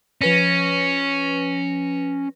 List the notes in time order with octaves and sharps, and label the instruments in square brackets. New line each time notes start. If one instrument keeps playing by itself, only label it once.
[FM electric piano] F3 B4 A#6 [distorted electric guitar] C#4